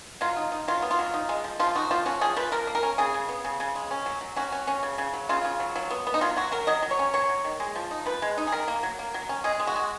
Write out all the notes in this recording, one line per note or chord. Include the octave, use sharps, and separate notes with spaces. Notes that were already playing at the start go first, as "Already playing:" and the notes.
F#3 F4
D#4
D#4
F#3 F4
B3
F4
F#3
D#4
G#3
F3
F3 F4
D#4 F#4
F3 F4
C#4 F#4
F3 G#4
F3 B4
F3 A#4
A#3
A#4
C#4
C#3 G#4
C#3
B3
C#3
C#3
G#3
C#4
F#3
F#3
C#4 F#4
C#4
C#4
C#3
C#3
F#3
C#3 F4
C#3
F#3
F#3
B3
B3
D#4
F#3 F4
F#3 F#4
F#3 A#4
F#3 D#5
F#3
C#5
C#4
F#3 C#5
F#3
D#3
G#3
F3
D#4
F3 B4
G#3
D#4
G#4
D#3 A#4
A#3
F#3
A#3
F#3
C#4
G#3 G#4
G#3
F#4
G#3